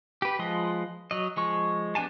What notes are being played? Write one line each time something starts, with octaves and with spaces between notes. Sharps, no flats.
G4 B4
F3 G#3 F4 B4 D#5
F#3 D#5
F3 G#3 C#6
B3 D4 G4 G#5 A5